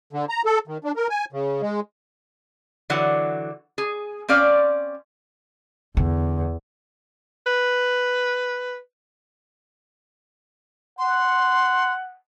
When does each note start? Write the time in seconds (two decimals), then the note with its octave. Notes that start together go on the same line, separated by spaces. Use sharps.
0.13 D3
0.29 A#5
0.45 A4
0.68 D#3
0.84 D4
0.96 A#4
1.10 G#5
1.33 C#3
1.62 G#3
2.90 D3 E3 F#3 F#5
3.78 G#4
4.28 C4 C#4 D5 F5
5.97 E2 D3
7.46 B4
10.99 F#5 C6